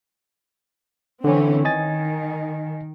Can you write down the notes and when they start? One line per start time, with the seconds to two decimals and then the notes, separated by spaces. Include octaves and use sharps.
1.24 D3 E3 C4 C#4
1.65 D#3 D#5 G#5 A6